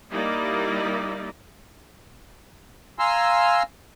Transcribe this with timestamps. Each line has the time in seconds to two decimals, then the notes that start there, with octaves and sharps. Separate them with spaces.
0.11 G3 A#3 D#4 E4 D5 D#5
2.99 F5 G#5 A#5 C6 E6